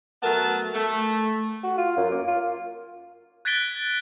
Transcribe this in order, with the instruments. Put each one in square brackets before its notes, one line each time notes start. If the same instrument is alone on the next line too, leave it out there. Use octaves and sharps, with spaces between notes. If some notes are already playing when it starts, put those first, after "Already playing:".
[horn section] F#3 A3 B3 A#4 A5
A3
[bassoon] F#4
F4
F#2
A#3
F4
[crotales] F#6 G#6 A6 B6 D7 G7